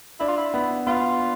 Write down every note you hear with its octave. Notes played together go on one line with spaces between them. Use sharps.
D4 E4
F4
E4
B3
B3 F4